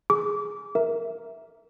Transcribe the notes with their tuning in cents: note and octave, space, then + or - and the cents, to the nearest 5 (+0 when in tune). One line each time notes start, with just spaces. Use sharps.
G#4 +0 D6 -30
A#4 +0 E5 -5